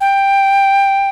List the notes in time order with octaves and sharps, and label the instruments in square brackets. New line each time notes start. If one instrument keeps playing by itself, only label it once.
[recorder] G5